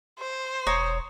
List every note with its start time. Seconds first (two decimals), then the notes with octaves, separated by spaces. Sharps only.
0.19 C5
0.67 E1 C#5 A#5 D#6